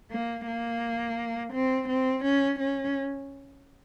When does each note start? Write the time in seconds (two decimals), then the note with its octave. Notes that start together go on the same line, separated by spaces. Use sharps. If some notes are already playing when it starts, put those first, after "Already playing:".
0.12 A#3
0.47 A#3
1.53 C4
1.88 C4
2.24 C#4
2.59 C#4